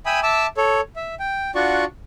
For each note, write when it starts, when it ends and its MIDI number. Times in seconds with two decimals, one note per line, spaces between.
0.06 0.20 76
0.06 0.20 79
0.06 0.20 80
0.06 0.20 83
0.06 0.20 87
0.06 0.20 88
0.23 0.47 76
0.23 0.47 81
0.23 0.47 86
0.23 0.47 88
0.57 0.81 69
0.57 0.81 73
0.96 1.15 76
1.20 1.51 79
1.55 1.85 62
1.55 1.85 65
1.55 1.85 66
1.55 1.85 74
1.55 1.85 78
1.55 1.85 85